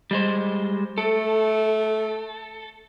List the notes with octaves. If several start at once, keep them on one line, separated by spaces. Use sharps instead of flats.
G3 G#3 C5
A3 A4